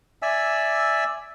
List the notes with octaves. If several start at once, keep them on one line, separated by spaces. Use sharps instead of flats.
D5 E5 G#5 E6